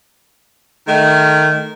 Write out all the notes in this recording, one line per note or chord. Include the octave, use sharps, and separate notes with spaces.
D#3 A3